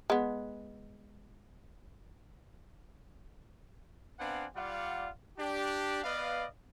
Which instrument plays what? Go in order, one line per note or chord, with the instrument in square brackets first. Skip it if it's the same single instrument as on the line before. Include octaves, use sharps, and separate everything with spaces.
[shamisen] G#3 B3
[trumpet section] B3 C4 D4 F5 F#5 G#5
G3 F4 D5 F5 F#5
D4 G4
B3 B4 D5 D#5 F5